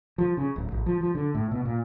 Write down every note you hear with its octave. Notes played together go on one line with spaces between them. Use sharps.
F3
C#3
D1
A1
F3
F3
D3
A2
B2
A#2